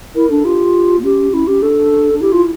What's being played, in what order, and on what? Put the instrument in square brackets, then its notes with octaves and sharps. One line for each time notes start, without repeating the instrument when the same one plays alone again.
[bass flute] E4 [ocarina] A#4
[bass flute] D4 [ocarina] A4
[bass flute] F4 [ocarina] G4
[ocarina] A#3
[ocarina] C#4 [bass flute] G4
[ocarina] C#4 [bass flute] E4
[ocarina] C#4 [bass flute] G4
[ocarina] D4 [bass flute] A4
[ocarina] D4
[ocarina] E4 [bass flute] G4
[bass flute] F4